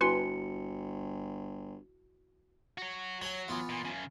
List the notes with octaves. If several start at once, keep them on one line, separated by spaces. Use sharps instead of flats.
G1 E4 F#4 B4 G#5 C6 C#7
F#4 C#5
F#3 C#5 G#5
E3 B3 F4
A#2
F#2 C#3